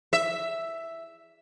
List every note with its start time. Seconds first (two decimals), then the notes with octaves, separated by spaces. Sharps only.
0.13 E5